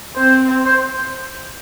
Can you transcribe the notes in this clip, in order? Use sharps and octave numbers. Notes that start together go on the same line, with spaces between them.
C4 C5
C5